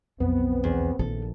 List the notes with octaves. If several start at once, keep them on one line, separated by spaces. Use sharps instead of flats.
B1 F2 B3 C4
E2
A#1 D#3 A4